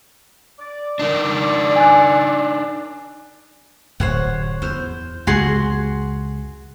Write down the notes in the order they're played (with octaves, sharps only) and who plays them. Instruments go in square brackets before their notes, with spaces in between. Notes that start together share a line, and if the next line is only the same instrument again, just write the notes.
[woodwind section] D5
[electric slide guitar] D4 D#4 A#4
[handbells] G#5 F#6
[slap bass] D1 F#2 [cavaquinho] C5 C#5 F#5
[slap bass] E2 [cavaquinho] C5
[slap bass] C#2 F#2 C3 [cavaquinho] F#4 G#4 C6